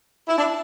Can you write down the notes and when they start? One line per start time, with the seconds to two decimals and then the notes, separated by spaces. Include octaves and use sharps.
0.27 E4
0.37 D4